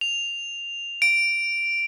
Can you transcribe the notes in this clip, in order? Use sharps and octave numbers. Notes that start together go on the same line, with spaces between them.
F7
D7